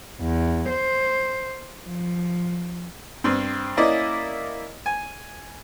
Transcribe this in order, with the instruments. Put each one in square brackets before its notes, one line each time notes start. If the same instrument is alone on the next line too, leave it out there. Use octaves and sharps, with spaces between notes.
[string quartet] E2
C5
F3
[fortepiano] G2 C4
A#3 C#4 E4 D5 D#5
G#5